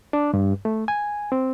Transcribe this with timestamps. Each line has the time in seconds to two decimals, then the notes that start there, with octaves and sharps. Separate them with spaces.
0.13 D4
0.34 G2
0.65 A3
0.88 G#5
1.32 C4